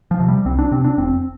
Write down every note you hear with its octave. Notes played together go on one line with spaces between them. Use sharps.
F3
C3
G3
C2 C4
D4
C3 C4
D4
F1 C4